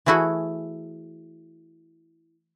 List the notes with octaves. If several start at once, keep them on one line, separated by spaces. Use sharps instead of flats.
E3 A3 E4 F#4 G#4